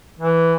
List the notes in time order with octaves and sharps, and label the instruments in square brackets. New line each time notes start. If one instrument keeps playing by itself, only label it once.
[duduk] E3